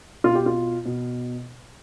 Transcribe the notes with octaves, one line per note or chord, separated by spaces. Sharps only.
B2 F4
G4
F4
B2